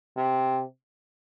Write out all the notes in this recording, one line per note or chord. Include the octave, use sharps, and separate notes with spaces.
C3